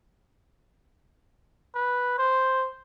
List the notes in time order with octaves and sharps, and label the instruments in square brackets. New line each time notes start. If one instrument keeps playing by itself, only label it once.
[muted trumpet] B4
C5